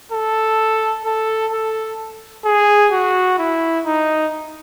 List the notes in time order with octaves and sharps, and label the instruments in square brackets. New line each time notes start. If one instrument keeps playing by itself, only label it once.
[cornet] A4
A4
A4
G#4
F#4
E4
D#4